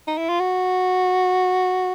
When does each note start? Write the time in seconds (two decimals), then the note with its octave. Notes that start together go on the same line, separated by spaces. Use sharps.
0.08 D#4
0.18 E4
0.29 F4
0.40 F#4